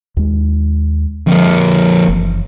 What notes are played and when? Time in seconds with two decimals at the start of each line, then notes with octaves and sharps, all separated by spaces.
0.17 D#2 G#3
1.27 F2 D3 A#3
2.08 F#1 E3